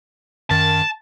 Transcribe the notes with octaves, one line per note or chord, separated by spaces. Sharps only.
F#2 D#3 A5